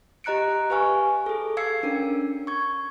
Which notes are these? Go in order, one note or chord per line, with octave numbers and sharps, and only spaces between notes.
G4 D#5 A#5 F#6 C#7 D7
G4 B4 F5 G#5 C#6 F6
G#4 A4
F5 E6 G#6 C7 C#7
C#4 D4 A#4
C#6 G#6